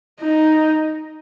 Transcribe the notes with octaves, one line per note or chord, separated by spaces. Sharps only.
D#4